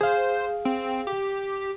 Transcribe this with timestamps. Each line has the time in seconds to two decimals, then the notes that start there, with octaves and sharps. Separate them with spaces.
0.01 G#4 C5 F5
0.65 C4
1.07 G4